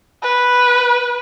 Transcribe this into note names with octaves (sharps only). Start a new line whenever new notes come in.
B4